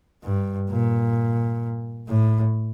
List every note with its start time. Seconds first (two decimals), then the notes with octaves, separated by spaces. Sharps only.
0.24 G2
0.69 A#2
2.08 A2